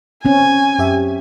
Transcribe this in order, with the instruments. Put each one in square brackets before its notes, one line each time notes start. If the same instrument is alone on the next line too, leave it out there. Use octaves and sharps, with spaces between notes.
[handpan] C4 C#4 [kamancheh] G#5
[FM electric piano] F#2 G4 E5